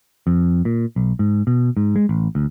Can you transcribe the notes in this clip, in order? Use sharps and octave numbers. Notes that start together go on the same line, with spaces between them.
F2
A#2
B1
G#2
B2
G#2
G#3
A1
D2